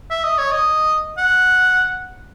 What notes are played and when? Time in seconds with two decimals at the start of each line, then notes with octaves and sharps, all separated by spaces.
0.10 E5
0.24 D#5
0.38 C#5
0.52 D#5
1.18 F#5